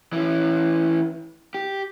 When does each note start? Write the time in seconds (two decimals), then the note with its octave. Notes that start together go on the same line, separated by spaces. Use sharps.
0.13 E3 C#4
1.54 G4